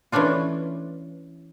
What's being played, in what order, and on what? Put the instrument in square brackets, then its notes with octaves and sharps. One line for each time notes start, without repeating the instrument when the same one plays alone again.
[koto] E3 A3 C#4 D4 F4